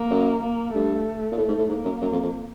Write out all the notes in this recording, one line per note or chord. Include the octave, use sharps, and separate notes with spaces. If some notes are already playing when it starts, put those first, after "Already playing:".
Already playing: A#3
F#2
A#3
G2 A3
A#2
A2 A3
G#2
A2
G#2 A#3
F#2
F#2
F2
F2